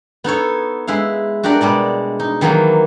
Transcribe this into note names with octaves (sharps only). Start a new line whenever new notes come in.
B3 D#4 A4 C#5
G#3 E4 B4 F5
D4 F#4 G4 A#4 D5
B2 G3 G#3 D5
D#4
D#3 E3 F#3 A#3 B3